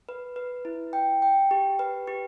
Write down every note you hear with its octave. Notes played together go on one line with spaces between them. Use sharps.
B4
B4
E4
G5
G5
G4
B4
G4